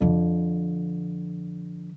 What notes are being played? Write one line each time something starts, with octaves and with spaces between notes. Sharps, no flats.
F2 D3